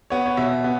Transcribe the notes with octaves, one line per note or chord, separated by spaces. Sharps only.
B3 C#5
C#5
B2 E5
B3